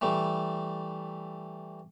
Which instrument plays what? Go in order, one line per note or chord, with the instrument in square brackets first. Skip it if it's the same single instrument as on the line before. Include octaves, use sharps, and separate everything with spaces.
[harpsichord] E3 G3 A3